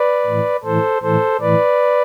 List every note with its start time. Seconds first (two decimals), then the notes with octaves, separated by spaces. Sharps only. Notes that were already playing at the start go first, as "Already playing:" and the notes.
Already playing: B4 D5
0.26 A2 E3
0.64 A2 E3 A4 C5
1.02 A2 E3 A4 C5
1.41 A2 E3 B4 D5